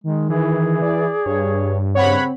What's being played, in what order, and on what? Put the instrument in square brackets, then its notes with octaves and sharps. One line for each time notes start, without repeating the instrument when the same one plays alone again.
[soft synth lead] D#3 [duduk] G#3
[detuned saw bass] E3 [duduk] G#4
[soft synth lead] D5
[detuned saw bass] G2 [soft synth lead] C#5
[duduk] C#3 [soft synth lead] C4 [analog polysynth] C#5 F#5 B5